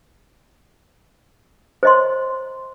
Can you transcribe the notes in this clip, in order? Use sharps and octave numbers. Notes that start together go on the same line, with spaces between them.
C5 C#5 D#5 A#5 C6